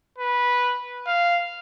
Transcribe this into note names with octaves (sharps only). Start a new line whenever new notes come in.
B4
F5